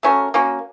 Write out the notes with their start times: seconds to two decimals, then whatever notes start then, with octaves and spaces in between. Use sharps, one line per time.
0.03 A3 C#4 F#4 A#4
0.34 A#3 C#4 F#4